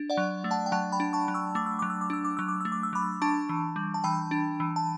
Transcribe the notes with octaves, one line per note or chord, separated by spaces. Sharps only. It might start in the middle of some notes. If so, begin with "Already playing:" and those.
Already playing: D4
D5 F#5
F#3
A3
F#5 A5
G5
F#3 F#5 A5
G5 B5
D4
A5 C#6
F#3
C#6 E6
A3 D6
E6
F#3 D6
E6
D6
D4 E6
D6
F#3 E6
D6
A3 E6
D6
E6
F#3 B5 D6
D4 A5 C#6
E3
G3
A5
E3 G5 B5
D4
E3
A5